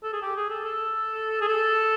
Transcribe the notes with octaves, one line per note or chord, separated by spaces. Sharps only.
A4
G#4
G4
G#4
A4
A4
G#4
A4